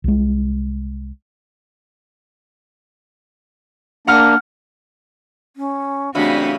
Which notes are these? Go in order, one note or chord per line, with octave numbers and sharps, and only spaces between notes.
C2 G#3
A#3 D4 F#5 A#5 F6
C#4
G2 C#3 E3 A3 C4 D4 F#4